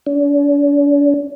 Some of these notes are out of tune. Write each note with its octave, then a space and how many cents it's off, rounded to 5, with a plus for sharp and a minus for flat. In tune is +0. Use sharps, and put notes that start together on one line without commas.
D4 -45